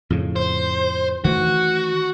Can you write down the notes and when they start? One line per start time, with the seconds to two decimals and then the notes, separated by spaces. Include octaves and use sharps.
0.10 F2 A2 C#3
0.36 C5
1.24 D#3 E3 A3 F#4